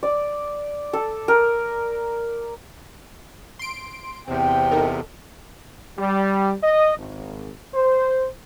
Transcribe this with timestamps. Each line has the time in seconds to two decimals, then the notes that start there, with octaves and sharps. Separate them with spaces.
0.03 D5
0.93 A4
1.28 A#4
3.59 C6 D7
4.28 E2 C3 C4 G5
4.71 D#4 A4 A#4
5.98 G3
6.63 D#5
6.98 G#1
7.74 C5